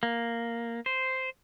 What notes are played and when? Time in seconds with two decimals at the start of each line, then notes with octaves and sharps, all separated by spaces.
0.03 A#3
0.86 C5